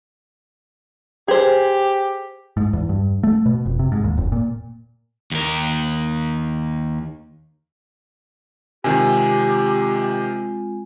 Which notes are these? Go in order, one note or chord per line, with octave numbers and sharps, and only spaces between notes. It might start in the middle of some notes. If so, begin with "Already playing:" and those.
G4 G#4 C5
G#2
E2
G2
A3
B2
F1
C3
G#2
D#2
F1
A#2
D#2 A#4
C3 D#3 G#3 C4 F4 G4 G#5